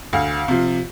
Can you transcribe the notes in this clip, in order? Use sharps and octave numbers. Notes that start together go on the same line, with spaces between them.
D2 F5
C3 F3